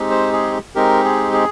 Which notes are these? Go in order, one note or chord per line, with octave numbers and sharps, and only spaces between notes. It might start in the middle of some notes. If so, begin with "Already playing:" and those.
Already playing: G#3 C4 D#4 G4
C5
G#4
G#3 C4 D#4 G4 A#4
G#4
G#4